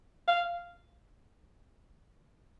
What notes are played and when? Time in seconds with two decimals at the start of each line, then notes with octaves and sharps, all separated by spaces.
0.28 F5